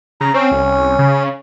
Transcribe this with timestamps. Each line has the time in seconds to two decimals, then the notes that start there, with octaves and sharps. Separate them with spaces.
0.21 C#3 A#5
0.34 C4 C#4
0.51 C2
0.99 C#3